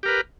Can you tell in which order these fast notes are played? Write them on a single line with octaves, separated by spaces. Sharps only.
G4 A#4 B4